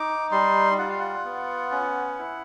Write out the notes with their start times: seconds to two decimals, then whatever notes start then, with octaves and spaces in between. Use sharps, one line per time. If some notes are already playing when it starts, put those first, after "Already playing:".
Already playing: D#4 D6
0.31 G3 C6
0.78 F4 F#5
0.89 F5
0.99 F#5
1.25 B3
1.71 C#4
2.18 E4